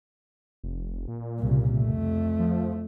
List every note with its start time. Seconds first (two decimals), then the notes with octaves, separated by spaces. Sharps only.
0.64 F1
1.08 A#2
1.39 C2 C#3
1.78 F2 A3
2.39 F3